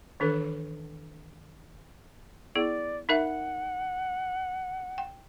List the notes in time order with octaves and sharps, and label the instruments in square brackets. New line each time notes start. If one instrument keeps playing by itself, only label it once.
[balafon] D#3 E3 D4 A4 B4
[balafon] B3 E4 G#4 [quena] D5
[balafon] D#4 A#4 E5 [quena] F#5
[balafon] G5